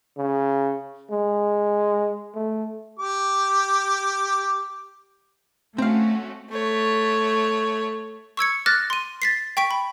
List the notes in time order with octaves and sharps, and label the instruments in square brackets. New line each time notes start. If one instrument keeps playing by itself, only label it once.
[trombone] C#3
G#3
A3
[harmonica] G4 D6
[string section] A3 C#4 F#4 [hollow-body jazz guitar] C4 F5
[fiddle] A3 C#5
[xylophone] C#6 E6 G#6 C#7
D6 F6 F#6 A6 A#6
C6 D#7
A6 B6 C7
G5 C#6 B6 D7
B5